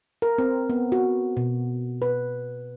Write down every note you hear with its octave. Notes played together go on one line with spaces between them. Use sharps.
A#4
C4
B3
F#4
B2
B4